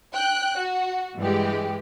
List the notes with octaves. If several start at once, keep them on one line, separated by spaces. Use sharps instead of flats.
G5 F#6
F#4
G2 E3 G#3 G4